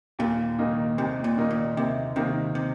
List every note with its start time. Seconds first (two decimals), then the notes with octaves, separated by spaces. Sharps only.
0.19 D#2 A#2
0.59 D#3 A#3 D#4
0.98 D#2 C3
1.24 A#2
1.37 D#3 A#3 D#4
1.51 A#2
1.77 D#2 C3
2.16 C3 D#3 A#3 D#4
2.55 C3